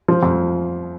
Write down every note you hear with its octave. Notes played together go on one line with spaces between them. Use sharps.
F3
F2